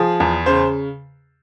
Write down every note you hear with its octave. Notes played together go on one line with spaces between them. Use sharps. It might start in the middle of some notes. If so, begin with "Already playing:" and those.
Already playing: F3 G#4
E2
C#3 C5